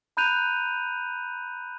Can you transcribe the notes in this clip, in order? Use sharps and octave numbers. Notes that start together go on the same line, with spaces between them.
A#5 B5 F#6 G6 D#7 F7